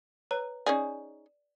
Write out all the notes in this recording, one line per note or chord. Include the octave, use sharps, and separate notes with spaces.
B4 C#5 A#5
C#4 D#4 G#4 D5